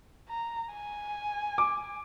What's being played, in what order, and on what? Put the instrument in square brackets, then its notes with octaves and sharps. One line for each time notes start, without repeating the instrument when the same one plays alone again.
[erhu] A#5
G#5
[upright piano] D6